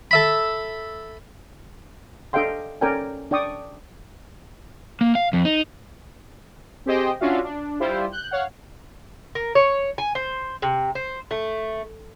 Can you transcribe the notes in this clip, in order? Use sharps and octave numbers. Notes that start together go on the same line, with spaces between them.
A4 E5 B5
D4 A4 D#5 F5 G5 C6
C#4 A4 A#4 D5 G5 G#5
D4 D5 G5 C#6 D#6
A#3
F5
F2
D#4
C4 G4 G#4 C5 D#5 G5
C#4 D4 F4 F#4 E5 F5
D4
G3 E4 F4 G4 C5
F#6 G6
C#5 F5 F#5
A#4
C#5
G#5
C5
C3
C5
A3